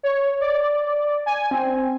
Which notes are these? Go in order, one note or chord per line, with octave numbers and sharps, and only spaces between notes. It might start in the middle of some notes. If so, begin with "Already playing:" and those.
C#5
D5
G#5
C4